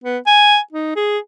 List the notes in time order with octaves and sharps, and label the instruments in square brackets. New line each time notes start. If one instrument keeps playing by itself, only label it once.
[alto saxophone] B3
G#5
D#4
G#4